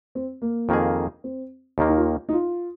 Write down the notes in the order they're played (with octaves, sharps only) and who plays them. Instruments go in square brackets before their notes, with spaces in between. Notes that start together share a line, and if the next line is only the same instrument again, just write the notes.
[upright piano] C4
A#3
[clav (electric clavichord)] F2 D#3 A#3 G#4
[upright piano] C4
[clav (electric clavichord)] D#2 D#3 A#3
[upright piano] D#4
F4
D#4
F4